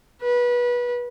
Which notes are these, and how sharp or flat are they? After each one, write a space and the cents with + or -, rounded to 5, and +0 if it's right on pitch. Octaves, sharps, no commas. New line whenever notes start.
B4 -25